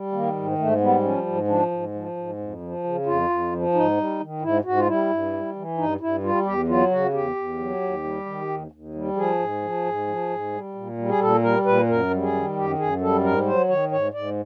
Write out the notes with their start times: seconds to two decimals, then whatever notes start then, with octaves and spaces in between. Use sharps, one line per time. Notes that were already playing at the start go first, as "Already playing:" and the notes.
Already playing: G3
0.12 D#3 A#3
0.36 G#2
0.58 G#2 A3
0.81 G3 B3
1.03 F3 C#4
1.26 G#2
1.48 F3 D4
1.71 G#2
1.94 F3
2.17 G#2
2.39 F2
2.61 F3
2.84 C#3
3.06 F2 F4
3.29 F2
3.52 F3
3.74 G#2 D#4
3.97 G3
4.20 D#3
4.42 G#2 E4
4.64 G#2 F#4
4.76 F4
4.87 G3 E4
5.10 G2
5.33 G3
5.55 E3
5.78 G2 D#4
6.00 G2 E4
6.23 G3 F4
6.46 E2 G4
6.68 F#3 F4
6.91 C#3 F#4
7.13 E2 G4
7.36 E2
7.59 F#3
7.81 D#2
8.04 G3
8.26 D#3
8.49 D#2
8.72 D#2
8.95 G3
9.17 F3 G#4
9.39 G#2
9.62 F3
9.85 G#2
10.07 F3
10.29 G#2
10.53 G3
10.75 A#2
10.98 G3
11.08 G#4
11.20 A#2 A4
11.42 G3 A#4
11.65 A#2 B4
11.88 F#2 A#4
12.11 G3
12.22 G#4
12.33 D#3
12.56 F#2 G4
12.78 F#2 G#4
13.01 G3 A4
13.23 G#2 A#4
13.46 F#3 C5
13.69 D#3 C#5
13.91 G#2 C#5
14.14 G#2 D5